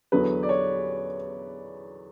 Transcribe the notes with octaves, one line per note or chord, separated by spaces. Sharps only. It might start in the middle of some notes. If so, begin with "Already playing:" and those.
E2 D3 F#3 B3 B4
D5
C#5